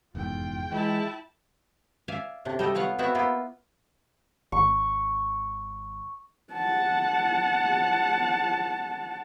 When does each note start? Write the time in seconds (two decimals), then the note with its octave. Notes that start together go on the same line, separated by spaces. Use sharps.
0.15 F1 E2 G#2 F4 G5
0.72 E3 G#3 E4 A5
2.08 D5 E5 F5 G#5
2.45 A2 C3 D4
2.59 G3 D#4 A4 D#5 G5
2.74 B3 F4 C#5 F5 F#5
2.99 B3 C4 E4 F#4 E5 F#5
3.15 A#3 B3 E4 F4
4.52 G#1 C#6
6.53 F#5 A5